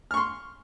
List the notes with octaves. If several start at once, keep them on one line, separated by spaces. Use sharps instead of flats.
C6 C#6 F6